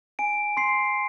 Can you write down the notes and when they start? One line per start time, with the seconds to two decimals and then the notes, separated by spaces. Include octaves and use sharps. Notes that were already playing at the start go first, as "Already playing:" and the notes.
0.19 G#5 D7
0.57 C6 C7